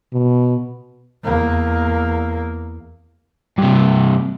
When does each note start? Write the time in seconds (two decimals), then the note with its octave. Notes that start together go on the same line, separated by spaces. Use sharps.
0.13 B2
1.24 E2 A#3
3.58 G2 C3